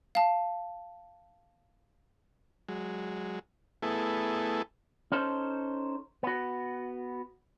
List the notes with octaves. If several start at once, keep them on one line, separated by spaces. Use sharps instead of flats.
F5 A5
F#3 G#3
A3 B3 E4 G#4 A4
C#4 D#4 A4 C5
B3 F#4